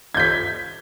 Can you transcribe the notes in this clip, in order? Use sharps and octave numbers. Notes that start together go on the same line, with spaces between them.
G6 G#6 B6